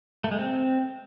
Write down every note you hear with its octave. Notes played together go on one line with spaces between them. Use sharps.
A3
G#3
C4